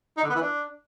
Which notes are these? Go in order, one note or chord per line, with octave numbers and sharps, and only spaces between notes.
D#4
D3
B3
E3
D4